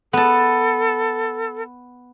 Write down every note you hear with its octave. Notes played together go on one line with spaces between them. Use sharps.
B3 A4 A5